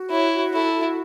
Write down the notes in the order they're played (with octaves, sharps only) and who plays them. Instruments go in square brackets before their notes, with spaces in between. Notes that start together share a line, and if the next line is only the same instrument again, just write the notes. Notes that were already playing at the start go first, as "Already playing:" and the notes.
Already playing: [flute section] F#4
[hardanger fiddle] E4 [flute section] C#5
[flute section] F#4
[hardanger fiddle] E4 [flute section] A4
[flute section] F#4